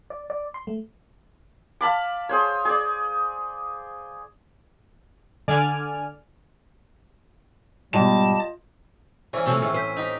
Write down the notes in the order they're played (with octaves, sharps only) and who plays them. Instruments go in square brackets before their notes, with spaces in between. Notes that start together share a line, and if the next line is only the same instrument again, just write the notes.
[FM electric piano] D5
D5
C6
A3
[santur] F5 A5 B5 D6
G#4 C5 C#5
G#4 D5
[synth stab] D3 D5 G#5 F6
[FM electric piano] G#2 B2 [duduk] G3 [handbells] F4 D#5 [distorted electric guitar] A5
[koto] E3 C#4 [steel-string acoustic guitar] G#4 [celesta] C5 D5 C#6
[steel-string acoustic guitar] C3 F3 A3 [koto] C4 C#4 A5
[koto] A2 [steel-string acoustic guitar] D#3 [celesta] G#4 E5 C#6
[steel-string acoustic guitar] C5 [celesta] G6 B6 D#7
[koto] D#4 G4